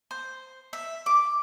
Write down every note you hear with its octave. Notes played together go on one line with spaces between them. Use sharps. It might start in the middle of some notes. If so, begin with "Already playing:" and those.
C5
E5
D6